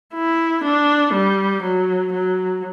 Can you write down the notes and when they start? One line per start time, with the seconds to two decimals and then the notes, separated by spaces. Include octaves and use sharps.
0.15 E4
0.64 D4
1.14 G3
1.63 F#3
2.13 F#3